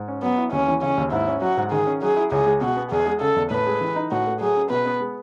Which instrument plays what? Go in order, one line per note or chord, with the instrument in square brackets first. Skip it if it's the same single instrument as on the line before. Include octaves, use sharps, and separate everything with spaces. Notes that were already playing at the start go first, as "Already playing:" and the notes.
Already playing: [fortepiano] G#2
C#4
[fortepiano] F#3 [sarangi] B3
[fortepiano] E4
[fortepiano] D#2 [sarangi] C#4
[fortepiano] E3
[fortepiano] C#3 [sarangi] C#4
[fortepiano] D#2
[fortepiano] G#2 [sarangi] E4
[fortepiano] C#4
[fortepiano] F#3 [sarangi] F#4
[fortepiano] G#2
[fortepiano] D#3 [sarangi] G#4
[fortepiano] C#4
[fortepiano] F#3 [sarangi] G#4
[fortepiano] E4
[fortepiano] C#2 [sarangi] G#4
[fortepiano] G#3
[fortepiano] B2 [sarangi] F#4
[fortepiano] B3
[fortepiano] E2 [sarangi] G#4
[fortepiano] G#3
[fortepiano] C#3 [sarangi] A4
[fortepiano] E2
[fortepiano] A2 [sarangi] B4
[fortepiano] G#3
E3
D#4
[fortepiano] A2 [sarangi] F#4
[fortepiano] A3
[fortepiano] F#3 [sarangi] G#4
[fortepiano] C#4
[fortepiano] B2 [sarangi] B4
[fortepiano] B3
G#3